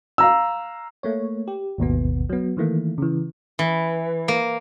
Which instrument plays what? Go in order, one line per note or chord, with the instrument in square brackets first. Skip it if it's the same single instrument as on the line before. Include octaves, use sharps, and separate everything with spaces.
[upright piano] F5 A#5 E6
[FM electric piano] A3 A#3 C#5
G4
G#1 D#2 B2 B3
F#3 B3
D#3 E3 A3 A#3
C#3 E3
[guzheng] E3
A#3